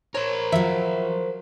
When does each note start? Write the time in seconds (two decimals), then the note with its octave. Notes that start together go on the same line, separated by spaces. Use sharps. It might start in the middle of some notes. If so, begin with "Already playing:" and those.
0.15 A#4 C5 C#5
0.52 F3 F#3 E5